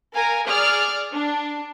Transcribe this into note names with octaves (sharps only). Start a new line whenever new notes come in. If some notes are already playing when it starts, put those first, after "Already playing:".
A#4 F5 G#5
G#4 D5 F6
D4